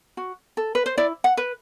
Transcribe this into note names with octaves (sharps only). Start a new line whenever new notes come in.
F#4
A4
B4
C5
E4 D5
F#5
B4